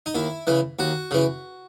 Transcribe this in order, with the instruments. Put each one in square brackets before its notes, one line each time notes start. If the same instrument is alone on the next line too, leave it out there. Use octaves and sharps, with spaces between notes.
[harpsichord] D#4
D#2 E4
C#3 E3
D#2 F#4
C#3 E3